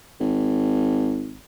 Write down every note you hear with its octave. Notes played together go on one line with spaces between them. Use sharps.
G#1